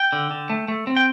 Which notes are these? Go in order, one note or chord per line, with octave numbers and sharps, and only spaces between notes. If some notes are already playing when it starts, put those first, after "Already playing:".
Already playing: G5
D3
D3
A3
A3
C4
G5